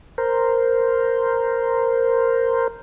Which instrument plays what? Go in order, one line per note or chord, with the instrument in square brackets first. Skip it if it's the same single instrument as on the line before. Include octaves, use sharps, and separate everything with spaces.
[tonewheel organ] A#4 C5